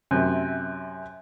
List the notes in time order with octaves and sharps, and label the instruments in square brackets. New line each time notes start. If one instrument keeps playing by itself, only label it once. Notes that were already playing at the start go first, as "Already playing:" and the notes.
[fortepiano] F#2 C3